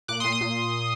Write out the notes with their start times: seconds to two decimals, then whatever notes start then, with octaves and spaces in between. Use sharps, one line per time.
0.08 A#2 D6 F#6
0.20 C6 D#6
0.24 A#2
0.32 C6 D#6
0.41 A#2